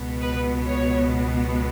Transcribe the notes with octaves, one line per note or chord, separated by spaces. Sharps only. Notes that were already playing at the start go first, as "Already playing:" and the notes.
Already playing: C#2 B2 B3
B4
C#5